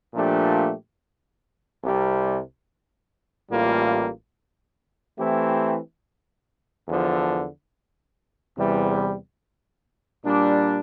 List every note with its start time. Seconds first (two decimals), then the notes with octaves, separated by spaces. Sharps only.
0.13 A#2 F3 A3 D4 G4
1.81 C2 C3 G3
3.50 A1 A2 G3 A#3 F4
5.18 E3 A3 C4 E4 G4
6.87 E2 D3 F3
8.56 E2 C3 E3 G3
10.24 A#2 G3 D4